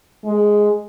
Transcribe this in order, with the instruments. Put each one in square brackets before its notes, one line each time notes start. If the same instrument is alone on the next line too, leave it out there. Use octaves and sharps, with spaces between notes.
[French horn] G#3